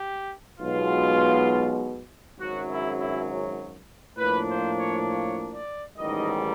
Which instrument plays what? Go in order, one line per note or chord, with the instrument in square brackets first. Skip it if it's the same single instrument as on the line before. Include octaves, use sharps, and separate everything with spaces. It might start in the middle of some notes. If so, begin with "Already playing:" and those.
Already playing: [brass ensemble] G4
B1 B2 G#3 B3 F4
G#1 F#2 C#3 F#3 F#4
E4
E4
A2 F3 A#3 D4 B4
C5
C#5
C#5
D5
A1 G#2 D#3 G3 D#5